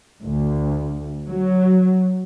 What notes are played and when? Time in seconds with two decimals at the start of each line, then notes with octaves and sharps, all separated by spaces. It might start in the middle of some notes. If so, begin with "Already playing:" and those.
0.22 D2
1.28 F#3